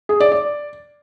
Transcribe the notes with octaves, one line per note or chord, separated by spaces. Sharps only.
G#4
D5
D5